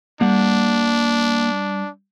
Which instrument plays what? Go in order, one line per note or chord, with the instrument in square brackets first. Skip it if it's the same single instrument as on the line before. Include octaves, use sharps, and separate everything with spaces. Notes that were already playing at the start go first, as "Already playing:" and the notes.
[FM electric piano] G3 [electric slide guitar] A#3 F#5 [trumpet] D4